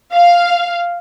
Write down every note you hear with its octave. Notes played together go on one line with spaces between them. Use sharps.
F5